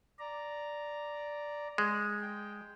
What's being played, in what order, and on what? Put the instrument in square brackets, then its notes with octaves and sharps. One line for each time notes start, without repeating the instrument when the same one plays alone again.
[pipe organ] D5 A#5
[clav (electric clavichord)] G#3
[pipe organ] G5